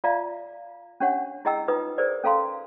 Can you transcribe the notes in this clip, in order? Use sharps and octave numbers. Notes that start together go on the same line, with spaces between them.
F4 D5 E5 F5 A#5
C#4 D4 G4 C#5 F#5
E4 G#4 D#5 G5 A#5 E6
D#4 F4 B4 D#6
G#4 A#4 C5 D5
C#4 A4 F5 A#5 C6